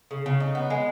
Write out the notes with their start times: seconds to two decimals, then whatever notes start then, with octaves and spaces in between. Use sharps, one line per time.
0.11 C#3
0.26 C#3
0.40 D#4
0.55 B3
0.70 G#3